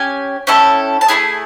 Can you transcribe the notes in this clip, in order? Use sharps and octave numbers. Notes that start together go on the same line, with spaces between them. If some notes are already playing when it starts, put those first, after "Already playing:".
Already playing: C#4 G4 G#5
C#4 E4 A4 G5
A5
A3 C4 E4 G#4 G#5